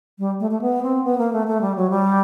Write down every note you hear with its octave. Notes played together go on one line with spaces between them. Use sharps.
G3
A3
A3
B3
C4
B3
A#3
A3
A3
G3
F#3
G3